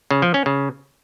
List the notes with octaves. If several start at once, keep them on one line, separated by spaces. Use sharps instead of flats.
C#3
F3
C#4
C#3